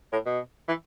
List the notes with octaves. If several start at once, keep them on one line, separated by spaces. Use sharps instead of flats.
A2
B2
E3